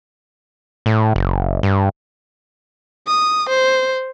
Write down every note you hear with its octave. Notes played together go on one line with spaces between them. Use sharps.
A2
F#1
G2
D#6
C5